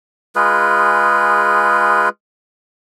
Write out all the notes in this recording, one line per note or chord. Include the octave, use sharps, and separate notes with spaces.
G#3 F4 G#4 B4